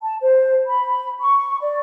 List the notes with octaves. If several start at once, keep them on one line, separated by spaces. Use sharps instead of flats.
A5
C5
B5
C#6
D5